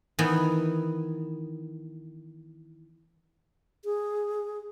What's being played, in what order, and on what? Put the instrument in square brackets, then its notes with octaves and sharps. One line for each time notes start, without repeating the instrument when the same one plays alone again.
[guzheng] D#3 E3 B3
[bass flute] G#4